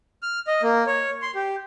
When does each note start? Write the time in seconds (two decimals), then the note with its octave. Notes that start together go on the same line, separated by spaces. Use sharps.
0.23 F6
0.47 D#5
0.63 A#3
0.87 C#5
1.22 C6
1.35 G4